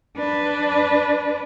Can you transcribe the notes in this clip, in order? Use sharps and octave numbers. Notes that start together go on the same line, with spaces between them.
D4 B4